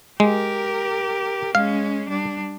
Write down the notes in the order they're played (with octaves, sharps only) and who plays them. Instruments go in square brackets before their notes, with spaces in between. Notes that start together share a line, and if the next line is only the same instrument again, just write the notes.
[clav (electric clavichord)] G#3 [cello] G4 A#4
[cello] G#3 C#4 [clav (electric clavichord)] F5
[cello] G3 D4